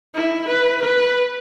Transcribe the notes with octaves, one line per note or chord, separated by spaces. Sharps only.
E4
B4
B4